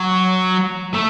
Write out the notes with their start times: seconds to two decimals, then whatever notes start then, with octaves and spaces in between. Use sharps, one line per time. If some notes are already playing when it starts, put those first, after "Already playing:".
Already playing: F#3
0.95 A3